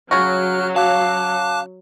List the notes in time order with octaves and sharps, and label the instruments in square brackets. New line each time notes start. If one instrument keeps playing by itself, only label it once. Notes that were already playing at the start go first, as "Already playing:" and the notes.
[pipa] C#3 F#4 [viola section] F#3 [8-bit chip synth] F6 F#6
[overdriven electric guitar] F5 [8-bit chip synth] A5 D6 F#6